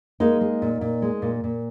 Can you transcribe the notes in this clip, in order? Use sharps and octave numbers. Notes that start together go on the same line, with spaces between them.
G#3 A#3 D#4
G#3
A#2
A#2
G#3
A#2
A#2